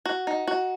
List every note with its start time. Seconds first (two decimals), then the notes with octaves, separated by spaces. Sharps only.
0.05 F#4
0.27 D#4
0.47 F#4